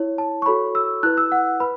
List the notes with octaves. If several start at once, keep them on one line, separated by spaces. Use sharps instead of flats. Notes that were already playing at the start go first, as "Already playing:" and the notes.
Already playing: E4 C#5
A5
C#6
F#4 A4 C#5 B5
E6
E4 B4 F#6
E6
F#5
B4 B5